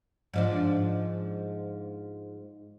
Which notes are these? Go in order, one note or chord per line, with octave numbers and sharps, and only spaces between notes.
G#2 F3 D4